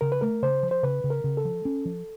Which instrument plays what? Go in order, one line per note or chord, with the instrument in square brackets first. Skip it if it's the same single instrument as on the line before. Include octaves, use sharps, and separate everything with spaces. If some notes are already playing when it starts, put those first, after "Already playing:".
[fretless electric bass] C#3 [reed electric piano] A#4
[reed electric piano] B4
[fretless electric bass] A3 [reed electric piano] A#4
[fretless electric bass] C#3 [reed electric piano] C5
[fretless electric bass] F3
[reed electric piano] C5
[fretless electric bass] C#3 [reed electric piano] B4
[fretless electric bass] C#3
[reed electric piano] A#4
[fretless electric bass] C#3
[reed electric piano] A4
[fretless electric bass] F3
C#4
F3